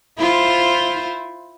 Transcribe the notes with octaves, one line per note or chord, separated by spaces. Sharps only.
E4 F4 C5